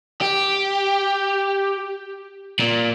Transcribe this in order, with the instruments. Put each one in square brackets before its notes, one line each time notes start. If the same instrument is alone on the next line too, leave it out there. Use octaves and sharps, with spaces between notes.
[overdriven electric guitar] G4
A#2